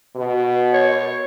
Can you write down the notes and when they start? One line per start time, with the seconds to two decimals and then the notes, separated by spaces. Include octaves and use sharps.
0.16 B2
0.73 C#5